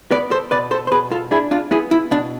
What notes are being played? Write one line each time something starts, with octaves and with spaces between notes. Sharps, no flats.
B3 B4 D5
A4 C5
B2 B4 D5
A4 C5
C5
B2 G#4 B4
F4 A4
D4 E4 G#4
D4 F4
B3 E4 G#4
E4
B2 D4